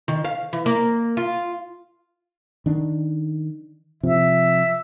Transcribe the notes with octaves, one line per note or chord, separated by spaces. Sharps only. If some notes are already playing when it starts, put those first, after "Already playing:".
D#3
F5
E3
A#3
F4
D#3 D4
C3 F3 E5